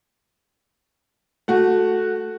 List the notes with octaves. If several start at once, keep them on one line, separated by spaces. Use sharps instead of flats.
A3 F#4